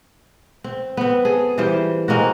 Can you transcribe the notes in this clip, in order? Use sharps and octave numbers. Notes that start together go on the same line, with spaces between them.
C4
B3 C4
G#4 A4
E3 G3 F4 C5
G#3 A#3 C4 F#4